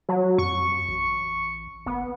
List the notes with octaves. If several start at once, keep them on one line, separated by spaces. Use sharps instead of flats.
F#3
F2 C#6
A1
G1 B3